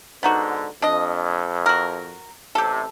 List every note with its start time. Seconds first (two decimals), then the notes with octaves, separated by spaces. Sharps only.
0.23 G#2 D3 B3 D#4 F#4
0.82 F2 D4 D#5
1.66 F#4 A#4
2.55 A1 C3 G4 A4